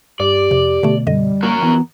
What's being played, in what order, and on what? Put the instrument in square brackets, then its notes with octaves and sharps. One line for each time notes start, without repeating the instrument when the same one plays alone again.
[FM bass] G2 [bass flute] G4 [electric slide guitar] D5
[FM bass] F2 [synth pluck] C3
[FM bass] B2 [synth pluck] D3 A3
[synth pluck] F#2 D3 D#5 [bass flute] G3
[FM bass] A#3 [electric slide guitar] F#4 A#4
[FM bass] E3 [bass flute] B3